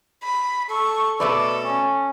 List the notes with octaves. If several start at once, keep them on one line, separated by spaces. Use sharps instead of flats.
B5
A4 C#6
B2 A3 A4 B4 D5
C#4